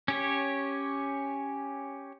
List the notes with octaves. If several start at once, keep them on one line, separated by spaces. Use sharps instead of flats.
C#4 G4 C#5